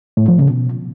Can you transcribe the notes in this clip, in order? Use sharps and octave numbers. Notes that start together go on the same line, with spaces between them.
A2
F3
C#3
B2